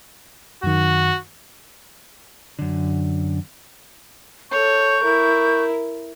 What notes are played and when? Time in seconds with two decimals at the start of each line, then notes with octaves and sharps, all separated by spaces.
0.63 F#2 D#3 F#4
2.59 F#2 D3
4.52 A4 C#5 C#6 G6
5.03 E4 A#4